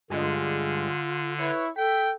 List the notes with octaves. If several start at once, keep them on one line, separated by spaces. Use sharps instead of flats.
G2 D3 G#3 F4
E4 B4 C#5
A4 G5 B6